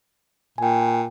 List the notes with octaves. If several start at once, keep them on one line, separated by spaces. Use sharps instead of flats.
A#2 G5 G#5